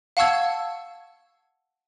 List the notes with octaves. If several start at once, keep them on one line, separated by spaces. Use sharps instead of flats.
F5 F#5 A5 C#6 E6 G#6